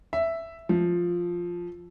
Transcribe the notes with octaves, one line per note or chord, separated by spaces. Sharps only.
E5
F3